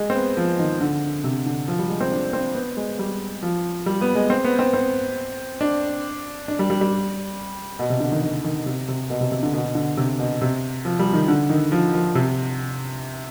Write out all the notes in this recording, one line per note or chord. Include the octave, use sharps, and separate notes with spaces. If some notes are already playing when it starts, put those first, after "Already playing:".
Already playing: G#3
C4
B3
F3
D#3
D3
C3
D3
F3
G3
G#3
C4
D4
C4
B3
G#3
G3
F3
G3
B3
G#3
C4
B3
C4
C4
D4
D4
G3
G3
G3
B2
C3
D3
D#3
D#3
D#3
C3
C3
B2
C3
C3
D3
B2
D3
C3
B2
C3
F3
G3
D#3
D3
D#3
F3
F3
C3